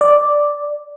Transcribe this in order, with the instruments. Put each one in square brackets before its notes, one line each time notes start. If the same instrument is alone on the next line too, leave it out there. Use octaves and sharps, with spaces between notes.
[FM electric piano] D5